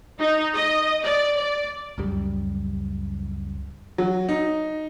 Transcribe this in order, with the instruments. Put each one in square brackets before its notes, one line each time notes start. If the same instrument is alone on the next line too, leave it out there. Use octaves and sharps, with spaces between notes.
[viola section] D#4
D#5
D5
D5
[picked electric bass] C#2 F#2 G3
[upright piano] F#3
D#4